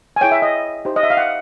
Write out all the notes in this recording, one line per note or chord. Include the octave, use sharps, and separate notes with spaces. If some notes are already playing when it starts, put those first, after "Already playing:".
G#5
E4 G#4 C#5 G5
E5
D#5
D#4 G4 C5
D#5
E5
F5
F#5